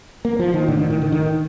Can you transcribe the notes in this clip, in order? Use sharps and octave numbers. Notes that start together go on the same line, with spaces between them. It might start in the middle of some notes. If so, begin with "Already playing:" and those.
A#3
F3
D#3
A2 D3
D#3
D#3
D3
D#3